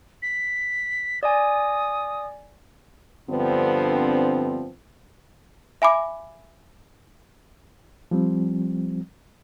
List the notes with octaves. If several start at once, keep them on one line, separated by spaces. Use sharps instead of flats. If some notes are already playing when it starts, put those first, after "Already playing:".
B6
D5 D#5 G#5 D#6
G2 D3 F3 B3 C4
E5 G#5 B5 D6
F3 G3 C4